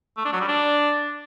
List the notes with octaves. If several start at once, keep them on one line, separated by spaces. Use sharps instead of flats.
A3
D4
F#3
G3
D4